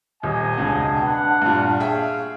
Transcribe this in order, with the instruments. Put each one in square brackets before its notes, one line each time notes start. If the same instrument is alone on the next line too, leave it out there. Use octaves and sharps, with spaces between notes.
[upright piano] D#1 [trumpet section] D#5 G#5
[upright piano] E1 C#2 [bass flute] D4
[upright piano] B3 [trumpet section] F#5
[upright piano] G2 A#2
[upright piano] G#4 E5 G5 [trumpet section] C#5 F5